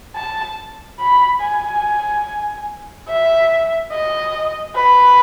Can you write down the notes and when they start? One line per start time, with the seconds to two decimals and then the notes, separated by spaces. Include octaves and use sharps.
0.16 A5
0.99 B5
1.41 G#5
3.08 E5
3.92 D#5
4.76 B4